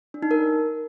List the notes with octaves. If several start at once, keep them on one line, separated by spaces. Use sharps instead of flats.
D4
D#4
A#4